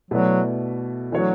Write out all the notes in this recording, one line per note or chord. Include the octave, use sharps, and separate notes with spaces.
B2 F#3 A3 E4 B4 D5
E3 F#3 A3 D4 F#4 C#5